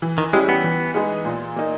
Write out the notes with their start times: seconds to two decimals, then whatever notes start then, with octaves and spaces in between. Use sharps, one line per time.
0.02 E3
0.18 D#3
0.33 G3 G#3 C#4 E4 G4
0.49 B3
0.64 E3
0.94 G#3 B3 D#4 G#4
1.25 A#2
1.56 A#3 D#4